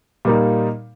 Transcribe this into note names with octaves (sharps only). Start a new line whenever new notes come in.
A#2 G3 A#3 D#4